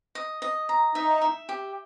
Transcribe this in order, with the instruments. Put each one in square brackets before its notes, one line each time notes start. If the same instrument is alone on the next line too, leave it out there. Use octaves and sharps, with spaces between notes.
[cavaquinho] D#5
D#5
A#5
[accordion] D#4 [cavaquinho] E5
[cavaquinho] E5
G4